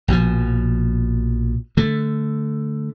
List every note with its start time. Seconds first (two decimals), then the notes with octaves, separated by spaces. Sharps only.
0.08 A#1 B2 D#3 F3
1.77 D3 A3